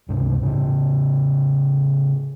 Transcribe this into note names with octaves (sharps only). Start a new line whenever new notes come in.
C#2 G2 C3
A2 C#3